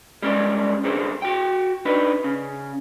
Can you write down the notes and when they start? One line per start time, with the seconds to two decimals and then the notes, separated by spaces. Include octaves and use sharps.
0.23 G3 G#3 C#4 D5
0.84 C2 D3 G#4 C5
1.22 F#4 G5
1.85 D4 D#4 B4
2.24 C#3